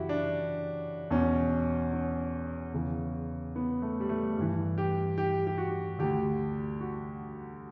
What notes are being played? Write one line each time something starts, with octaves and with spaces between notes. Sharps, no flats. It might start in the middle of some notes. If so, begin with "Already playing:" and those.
Already playing: F#2 C#3 E3 E4 F#4 G4
D4
E2 B2 C#4
C#4
E2 C#3 E3
B3
A3
G3
A3
G2 E3
G4
G4
G4
F#4
D2 D3 G4
F#4